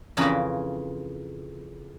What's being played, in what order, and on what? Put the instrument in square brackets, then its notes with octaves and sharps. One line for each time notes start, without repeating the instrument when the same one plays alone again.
[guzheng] F2 C#3 E3 F4 A#4 B5